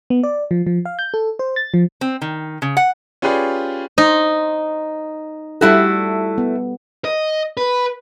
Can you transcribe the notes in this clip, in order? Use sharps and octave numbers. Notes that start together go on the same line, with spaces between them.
B3
D5
F3
F3
F5
G6
A4
C5
A6
F3
C4
D#3
C#3
F#5
C#4 F4 G4 G#4 B4 D5
D#4 C5
G3 A3 E4 F#4 G4 A4
B3
D#5
B4